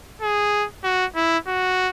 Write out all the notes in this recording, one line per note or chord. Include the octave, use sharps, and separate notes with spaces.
G#4
F#4
E4
F#4